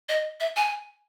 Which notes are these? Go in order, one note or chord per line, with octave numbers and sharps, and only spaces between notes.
D#5
E5
G#5